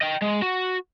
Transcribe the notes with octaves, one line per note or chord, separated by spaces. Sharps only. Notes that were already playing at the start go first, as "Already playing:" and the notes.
D#5 G5
G#3
F#4